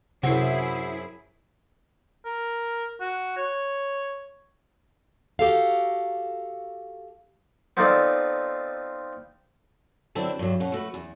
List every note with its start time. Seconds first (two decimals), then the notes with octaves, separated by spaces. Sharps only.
0.23 F#2 C3 C4 E4 F#4 G#4 C7
2.25 A#4
3.01 F#4
3.37 C#5
5.39 F#4 G4 A4 F5
7.77 B3 C4 D#4 F4 A4 D5
10.15 D3 F#3 C4 D4 E4
10.39 G2 F#3
10.60 B2 C#4 F#5
10.72 A3 F#4 A4 B4
10.94 E2